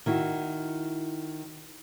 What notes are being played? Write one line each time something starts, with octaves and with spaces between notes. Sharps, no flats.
D#3 E4 F#4